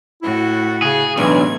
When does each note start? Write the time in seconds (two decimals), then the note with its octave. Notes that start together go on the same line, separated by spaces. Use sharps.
0.22 A2 E4 F#4
0.82 C#3 G#4
1.17 B1 A2 E3 D4 G#6